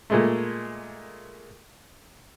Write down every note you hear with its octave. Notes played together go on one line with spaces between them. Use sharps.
A#2 G#3 A3